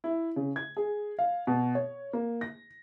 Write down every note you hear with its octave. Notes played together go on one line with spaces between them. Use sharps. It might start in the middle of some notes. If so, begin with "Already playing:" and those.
E4
C#3
G#6
G#4
F5
B2
C#5
A#3
A#6